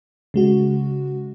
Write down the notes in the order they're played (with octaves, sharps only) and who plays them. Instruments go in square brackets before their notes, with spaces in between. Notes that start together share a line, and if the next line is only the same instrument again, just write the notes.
[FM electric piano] C#3 G#3 F#4